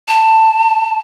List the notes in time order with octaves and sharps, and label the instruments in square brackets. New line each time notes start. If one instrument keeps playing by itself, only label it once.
[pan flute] A5